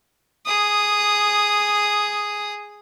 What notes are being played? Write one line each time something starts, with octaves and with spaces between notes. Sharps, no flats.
G#4 D#6